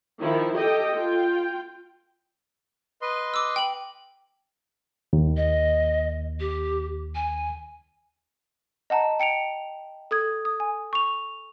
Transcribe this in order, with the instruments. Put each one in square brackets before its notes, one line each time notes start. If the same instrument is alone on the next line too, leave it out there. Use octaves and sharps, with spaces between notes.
[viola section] D#3 F3 E4
G4 A4 D#5 G5
F4 G5
[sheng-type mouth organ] B4 D#5 C6
[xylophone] D6 E6
G5 F#7
[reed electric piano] D#2
[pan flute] D#5
G4
G#5
[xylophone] D#5 F#5 A5 A#5
G5 C#7 D7 F7
A4 D#6 G#6
D#6
G#5
C#6 F7